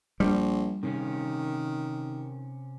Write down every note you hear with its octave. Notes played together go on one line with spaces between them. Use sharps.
A#1 G3
C3 D#3 C#4